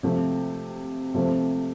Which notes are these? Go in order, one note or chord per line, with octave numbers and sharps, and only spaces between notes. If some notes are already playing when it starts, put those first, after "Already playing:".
C3 F3 A3
C3 F3 A3 C4